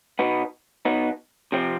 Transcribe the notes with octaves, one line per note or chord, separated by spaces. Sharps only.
B2 B3 D#4
B2 B3 D#4
C3 F3 C4